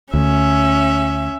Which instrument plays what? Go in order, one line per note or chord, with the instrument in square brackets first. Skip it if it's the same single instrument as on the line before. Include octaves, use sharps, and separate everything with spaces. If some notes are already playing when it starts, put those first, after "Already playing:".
[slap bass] D2 [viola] C#4 E5